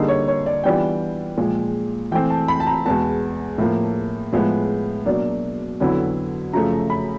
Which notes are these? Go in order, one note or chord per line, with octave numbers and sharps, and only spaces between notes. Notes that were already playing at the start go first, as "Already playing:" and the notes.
Already playing: D3 G3 A#3 D#4 G#4
C#5
C#5
D5
E3 G3 B3 D4 F4 G5
A#2 F3 G#3
E3 A3 C4 G5
A5
B5
A5
A#5
E2 B2 G#3 B3 A5
A2 F3 A#3
A2 F3 G#3 B3
B2 F#3 A#3 D4
F2 D3 F#3 B3 E4
F#2 C#3 F3 A3 A#5
B5